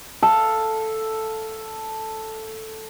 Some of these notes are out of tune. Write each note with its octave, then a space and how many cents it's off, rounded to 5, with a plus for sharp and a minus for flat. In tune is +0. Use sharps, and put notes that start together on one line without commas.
A4 +0 F5 +0 A5 +0